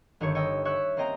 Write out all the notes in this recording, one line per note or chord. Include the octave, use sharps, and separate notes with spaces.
G1 D#3 G4 C#5
C#5 D#5 G5 E6
G4 C#5 E5 C#6 F#6
A#3 C4 C#4 D#5 G5 A#5